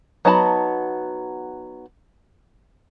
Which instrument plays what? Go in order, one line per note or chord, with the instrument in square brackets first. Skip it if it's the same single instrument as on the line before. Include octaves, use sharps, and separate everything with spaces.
[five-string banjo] F#3 B3 D#4 A5 B5